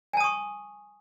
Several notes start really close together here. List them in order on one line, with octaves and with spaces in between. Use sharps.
G#5 A5 D#6 C#6